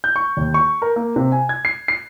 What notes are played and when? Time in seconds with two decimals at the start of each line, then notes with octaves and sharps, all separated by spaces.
0.04 G6
0.16 C#6
0.37 D#2
0.54 C#6
0.82 A#4
0.96 A#3
1.16 C3
1.32 G#5
1.49 G#6
1.65 C7
1.88 C7